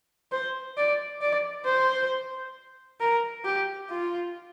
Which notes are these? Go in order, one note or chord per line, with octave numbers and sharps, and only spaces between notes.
C5
D5
D5
C5
A#4
G4
F4